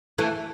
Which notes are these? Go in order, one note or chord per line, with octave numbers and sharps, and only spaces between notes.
E3 A3